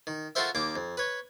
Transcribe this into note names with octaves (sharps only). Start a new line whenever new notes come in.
D#3
F4 F#4 A4 A#4 C5 E5
D#2 A#3 D6
F2
B4 C#5